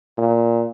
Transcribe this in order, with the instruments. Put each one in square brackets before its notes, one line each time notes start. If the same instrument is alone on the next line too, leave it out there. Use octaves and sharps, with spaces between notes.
[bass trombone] A#2